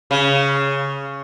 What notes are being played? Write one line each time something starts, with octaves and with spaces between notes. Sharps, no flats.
C#3